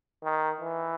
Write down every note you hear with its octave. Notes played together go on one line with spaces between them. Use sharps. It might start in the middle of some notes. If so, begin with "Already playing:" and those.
D#3
E3